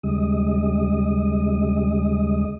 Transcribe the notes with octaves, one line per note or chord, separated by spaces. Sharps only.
D#2 C#3 G3 G#3 D#5